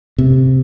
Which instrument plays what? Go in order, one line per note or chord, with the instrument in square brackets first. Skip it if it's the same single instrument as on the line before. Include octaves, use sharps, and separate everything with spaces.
[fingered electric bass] C3